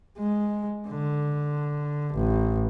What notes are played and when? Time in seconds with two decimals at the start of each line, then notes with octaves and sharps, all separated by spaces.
0.18 G#3
0.88 D3
2.14 A1